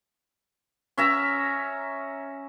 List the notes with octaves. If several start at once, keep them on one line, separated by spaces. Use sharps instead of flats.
C#4 E5 A#5